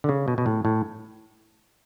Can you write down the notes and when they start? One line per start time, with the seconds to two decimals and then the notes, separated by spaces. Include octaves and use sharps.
0.04 D3
0.09 C#3
0.28 B2
0.38 B2
0.46 A2
0.65 A2